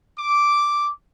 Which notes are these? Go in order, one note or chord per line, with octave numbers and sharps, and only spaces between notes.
D6